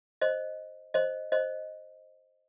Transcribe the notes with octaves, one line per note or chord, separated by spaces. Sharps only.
C5 D#5
C5 D#5
C5 D#5